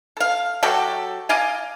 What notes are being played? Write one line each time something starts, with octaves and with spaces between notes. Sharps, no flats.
A4 F5
F#3 F#4 G4 A4
D5 D#5 F5 G#5